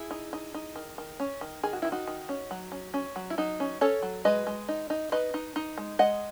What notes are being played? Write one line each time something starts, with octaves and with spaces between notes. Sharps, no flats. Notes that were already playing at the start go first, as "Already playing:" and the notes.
Already playing: E4 G#4
D#4
D#4
D#4
D#3
D#3
C#4
D#3
D#3 G#4
F#4
D#3 E4
D#4 F#4
D#3
C#4
F#3
C#4
C#4
F#3
E4
F#3 D#4
C#4
C#4 A4 C#5
F#3
G#3 B4 D#5
G#3
D#4
D#4
D#4 B4 D#5
D#4
D#4
G#3
G#3 D#5 F#5